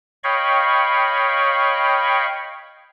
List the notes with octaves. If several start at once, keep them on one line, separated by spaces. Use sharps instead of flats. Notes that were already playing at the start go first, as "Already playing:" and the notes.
C#5 D#5 F5 G5 B5 C#6